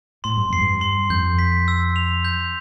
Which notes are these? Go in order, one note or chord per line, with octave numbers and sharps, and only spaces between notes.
A2 C6
G2
F2 C7
G2
C6
F2 G6
B6
E6
F7
G6